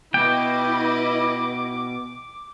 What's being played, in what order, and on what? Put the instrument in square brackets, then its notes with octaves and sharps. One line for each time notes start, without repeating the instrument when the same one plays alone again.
[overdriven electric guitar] B2 [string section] E4 B4 D#5 [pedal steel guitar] G5 [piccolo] D6